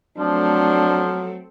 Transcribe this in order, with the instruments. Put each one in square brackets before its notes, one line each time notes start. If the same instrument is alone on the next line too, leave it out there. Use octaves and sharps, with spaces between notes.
[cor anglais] F3 [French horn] F#3 [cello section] A3 C4 A4 [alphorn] D4